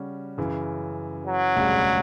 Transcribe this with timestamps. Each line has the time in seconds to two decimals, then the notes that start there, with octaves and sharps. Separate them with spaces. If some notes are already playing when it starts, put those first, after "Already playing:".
Already playing: C#3 G3 C#4 F#4
0.38 F#2 C#3 E3
1.27 F#3
1.56 E1 D2 C#3 G3